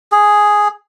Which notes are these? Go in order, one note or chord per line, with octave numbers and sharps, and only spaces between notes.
G#4